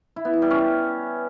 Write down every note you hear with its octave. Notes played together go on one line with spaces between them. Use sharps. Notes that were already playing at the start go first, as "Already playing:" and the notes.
E4
B3
E4
G3
C#4